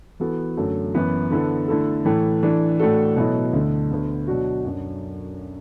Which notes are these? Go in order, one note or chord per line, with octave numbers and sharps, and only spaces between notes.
E3 B3 F#4 A4
F#2 D3 F#3 A3
F#2 E3 B3 E4
D3 B3 E4 A4
D3 A3 E4 A4
A2 E3 A3
E3 D4 A4
A2 A3 D4 F#4 A4
B2 F#3 B3 E4 A4
D2 D3 A3
D2 D3 B3
B2 F#3 D4 F#4
F#2 F#3 D4